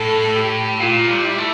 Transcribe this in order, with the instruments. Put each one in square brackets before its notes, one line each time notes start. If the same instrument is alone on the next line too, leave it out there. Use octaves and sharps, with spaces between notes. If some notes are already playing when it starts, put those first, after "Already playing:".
Already playing: [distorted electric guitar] A2 [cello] A4
[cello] G4
[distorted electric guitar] A#2 [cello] F4
[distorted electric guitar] G3
[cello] E4
[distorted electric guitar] A3